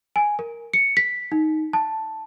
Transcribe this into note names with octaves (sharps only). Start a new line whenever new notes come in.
G#5
A#4
C#7
B6
D#4
A5